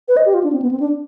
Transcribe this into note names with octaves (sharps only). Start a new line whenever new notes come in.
B4
D#5
G4
F4
D4
C4
B3
C4
D4